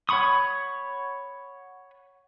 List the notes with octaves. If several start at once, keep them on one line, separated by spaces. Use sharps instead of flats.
C#5 F#5 B5 C#6 D#6